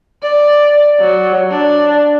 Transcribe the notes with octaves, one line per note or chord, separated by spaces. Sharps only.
D5
F#3
D4